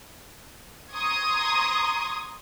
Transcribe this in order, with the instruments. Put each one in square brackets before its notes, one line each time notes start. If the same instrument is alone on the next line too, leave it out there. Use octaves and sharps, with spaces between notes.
[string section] A#5 C6 C#6 D#6 G#6